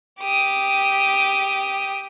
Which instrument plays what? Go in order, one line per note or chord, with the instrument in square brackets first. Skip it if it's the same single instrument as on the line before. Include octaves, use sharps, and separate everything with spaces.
[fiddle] G4 D#6